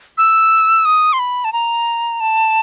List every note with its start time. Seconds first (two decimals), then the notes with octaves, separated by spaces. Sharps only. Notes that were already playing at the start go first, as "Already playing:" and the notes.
0.18 E6
0.85 D#6
1.13 C6
1.19 B5
1.45 A5
1.53 A#5
2.20 A5